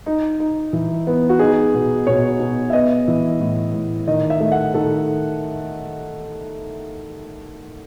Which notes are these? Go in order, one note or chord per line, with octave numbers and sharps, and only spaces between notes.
D#4
D#4
E3
B3
F#4
D#4 G#4
B2
B2 C#5
B2
E5
B3 D#5
E3
A2
A2
D#3 D#5
E5
A3
F#5
D#3 A4